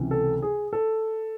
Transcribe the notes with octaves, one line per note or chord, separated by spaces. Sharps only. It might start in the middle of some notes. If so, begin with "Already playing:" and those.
Already playing: C#2 C3 E3
A4
G#4
A4